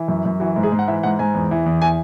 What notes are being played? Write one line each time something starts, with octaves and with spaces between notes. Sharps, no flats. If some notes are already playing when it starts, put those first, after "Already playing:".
Already playing: E3
F#2
F#2
E3 F#4
G#2
G#4
G#2
F#5
E3 E5
G#2 F#5
G#2 G#5
E2
E3
E2
E3 G#5